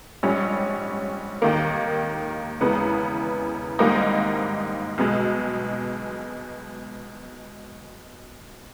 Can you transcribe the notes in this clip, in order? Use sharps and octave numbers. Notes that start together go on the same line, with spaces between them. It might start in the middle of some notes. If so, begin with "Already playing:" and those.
A#1 G#2 G3 C#4
D#2 D#3 A#3
E2 C#3 G#3 B3
G#1 G#2 G3 A#3 D#4
B1 B2 G#3